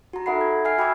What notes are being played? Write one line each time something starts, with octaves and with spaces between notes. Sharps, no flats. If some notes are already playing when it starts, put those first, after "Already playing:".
F#4 A#5
D#4 A4 E5 F#5 B5 C7
G#6
E5 G#5 F6 G#6 C7
F#4 G5 B5 D6 E6 G#6